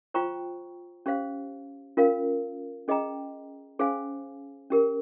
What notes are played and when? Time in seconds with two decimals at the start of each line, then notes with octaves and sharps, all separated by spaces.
0.14 F4 C5 G5 A#5 C#6
1.06 C#4 G4 C5 F5
1.97 C#4 F4 A#4 F5
2.88 C#4 G#4 D#5 G5 A#5
3.79 C#4 G#4 C5 F5 G#5
4.70 C#4 G4 A#4